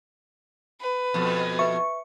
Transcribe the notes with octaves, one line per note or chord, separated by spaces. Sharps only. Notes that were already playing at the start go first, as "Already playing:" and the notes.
B4
F2 B2
B4 E5 C#6